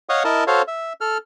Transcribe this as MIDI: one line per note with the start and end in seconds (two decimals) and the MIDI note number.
0.09 0.23 73
0.09 0.23 75
0.09 0.23 77
0.09 0.23 78
0.09 0.23 85
0.09 0.23 87
0.25 0.44 64
0.25 0.44 70
0.25 0.44 75
0.25 0.44 81
0.47 0.62 66
0.47 0.62 69
0.47 0.62 72
0.47 0.62 73
0.47 0.62 77
0.68 0.93 76
1.01 1.18 69
1.01 1.18 89